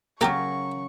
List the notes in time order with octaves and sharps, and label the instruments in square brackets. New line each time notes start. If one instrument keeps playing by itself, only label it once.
[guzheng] C#3 F#3 [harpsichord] A#3 G4 [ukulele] A#4 [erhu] C#6